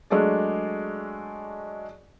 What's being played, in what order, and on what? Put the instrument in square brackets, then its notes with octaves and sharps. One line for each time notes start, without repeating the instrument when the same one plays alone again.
[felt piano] F#3 G#3 A3 D4 G#4 D5